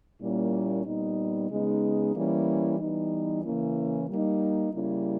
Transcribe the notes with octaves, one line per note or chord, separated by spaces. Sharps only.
A#2 G3 A#3 C#4 E4
A#2 G3 B3 D#4
C#3 G#3 B3 D#4
E3 G3 A#3 C#4 E4
E3 G3 B3 D#4
C#3 E3 A#3 C#4 E4
G3 A#3 D#4
C#3 G3 A#3 C#4 E4